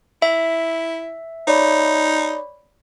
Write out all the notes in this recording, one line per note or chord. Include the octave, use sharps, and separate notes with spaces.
E4 E5
D#4 C#5 D5 B5